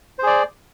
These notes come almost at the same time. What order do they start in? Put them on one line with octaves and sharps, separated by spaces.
C5 G#4 D5